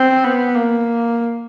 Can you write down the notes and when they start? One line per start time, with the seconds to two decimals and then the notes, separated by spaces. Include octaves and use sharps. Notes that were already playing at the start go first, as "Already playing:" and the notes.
Already playing: C4
0.24 B3
0.56 A#3